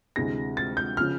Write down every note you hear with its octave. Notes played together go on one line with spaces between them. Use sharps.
D2 C3 E3 G#3 A#6
A6
G6
C#3 F3 F6